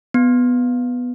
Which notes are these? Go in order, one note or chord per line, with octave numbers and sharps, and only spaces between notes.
B3